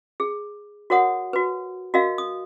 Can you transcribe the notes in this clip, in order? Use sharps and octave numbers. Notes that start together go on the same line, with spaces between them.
G#4
F#4 A#4 C#5 F#5 D#6
F#4 B4
F#4 A#4 D#5 F5
D#6